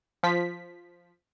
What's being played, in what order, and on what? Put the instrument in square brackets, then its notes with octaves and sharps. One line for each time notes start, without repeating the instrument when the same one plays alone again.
[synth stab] F3 B6